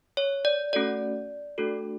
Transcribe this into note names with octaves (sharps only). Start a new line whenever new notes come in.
C#5
D5
A3 C#4 F#4 A4 D5
A3 D4 F#4 A4